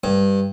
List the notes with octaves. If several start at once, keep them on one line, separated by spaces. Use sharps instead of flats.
G2